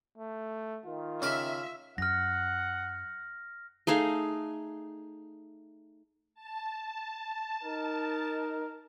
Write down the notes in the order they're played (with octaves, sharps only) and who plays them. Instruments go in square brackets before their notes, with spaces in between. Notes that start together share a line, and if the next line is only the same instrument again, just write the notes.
[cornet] A3
[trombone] D#3 [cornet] F4
[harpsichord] C#3 F5 D6 [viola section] E5
[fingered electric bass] F#2 [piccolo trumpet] F#5 [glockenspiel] F6 A#6
[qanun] A3 D#4 G#4 F5
[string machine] A5
[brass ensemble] D#4 A#4